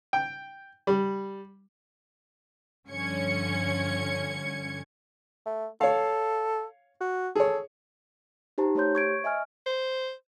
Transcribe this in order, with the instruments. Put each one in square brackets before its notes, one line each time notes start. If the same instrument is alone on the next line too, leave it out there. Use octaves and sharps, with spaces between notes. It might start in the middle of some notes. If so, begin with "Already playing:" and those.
[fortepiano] G5
G3
[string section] G2 D3 F3 C#4 G#6 C#7
[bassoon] A3
[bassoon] A4 [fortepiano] C#5 F5
[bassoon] F#4
[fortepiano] G#4 C#5 [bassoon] A4
[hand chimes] D#4 G4 C5 A5 A#5
A3 G4 C5 C#5 C6 G6
C#6 G#6 D7
D#5 E5 G#5 F6
[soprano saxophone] C5